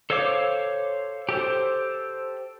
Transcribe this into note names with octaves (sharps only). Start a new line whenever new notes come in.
A4 C5 C#5 F5 D6
G4 A4 C5